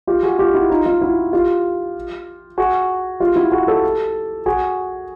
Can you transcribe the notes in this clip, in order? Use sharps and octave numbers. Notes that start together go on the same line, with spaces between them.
F4 G4
F#4 G#4
F4 G4
E4 F#4
D#4 F4
D#4 F4
E4 F#4
F4 G4
F#4 G#4
F4 G4
E4 F#4
F#4 G#4
G4 A4
F#4 G#4